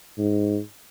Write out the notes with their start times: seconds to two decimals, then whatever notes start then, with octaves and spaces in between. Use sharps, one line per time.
0.18 G#2